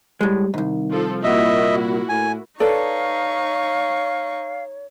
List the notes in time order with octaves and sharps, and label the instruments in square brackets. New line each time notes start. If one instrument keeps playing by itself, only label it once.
[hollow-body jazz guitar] A2 G#3 [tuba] G3
[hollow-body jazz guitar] C2 G#2 [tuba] D#3
[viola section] F3 A4
[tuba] A#2 [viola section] A#3 E4 F#4 [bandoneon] D#5 E5
[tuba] A2 [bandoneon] G#5
[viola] D#4 C#6 [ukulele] A4 B4 D5 [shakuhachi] C#5 [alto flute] F5